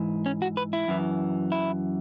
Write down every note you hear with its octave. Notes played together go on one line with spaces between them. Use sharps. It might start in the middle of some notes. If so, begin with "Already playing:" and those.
Already playing: G#2 E3
C#4
F#4
B4
E4
F#2 E3
E4